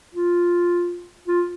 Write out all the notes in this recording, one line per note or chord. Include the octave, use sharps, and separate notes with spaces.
F4
F4